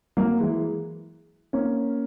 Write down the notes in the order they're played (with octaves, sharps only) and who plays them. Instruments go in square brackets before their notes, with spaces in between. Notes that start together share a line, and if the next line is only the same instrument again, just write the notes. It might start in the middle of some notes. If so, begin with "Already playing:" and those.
[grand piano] F#3 A#3
E3 G#3
A#3 C#4